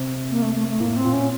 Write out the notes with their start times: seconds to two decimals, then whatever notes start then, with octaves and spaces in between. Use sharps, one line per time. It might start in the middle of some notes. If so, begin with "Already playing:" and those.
Already playing: C3
0.31 A#3
0.42 A3
0.55 A3
0.68 A3
0.80 A2 A#3
0.96 C4
1.05 A#2
1.13 C#4